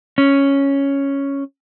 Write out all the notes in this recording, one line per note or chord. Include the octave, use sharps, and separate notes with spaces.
C#4